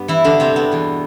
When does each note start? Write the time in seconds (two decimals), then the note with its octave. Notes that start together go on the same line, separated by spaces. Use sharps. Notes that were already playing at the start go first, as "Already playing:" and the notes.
Already playing: G2 B3 B4
0.08 E3 E4
0.24 D3 D4
0.40 C3 C4
0.56 B3
0.72 E2 B2